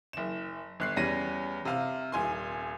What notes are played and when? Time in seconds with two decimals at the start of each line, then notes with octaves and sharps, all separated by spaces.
0.13 F#1 E7
0.80 G1 F#6 C7
0.97 E2 G3 C#4 A#6 D#7
1.65 C3 F5 F6
2.12 D#1 G#5 C6